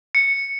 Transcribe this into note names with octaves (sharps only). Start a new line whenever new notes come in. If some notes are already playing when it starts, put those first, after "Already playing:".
C#7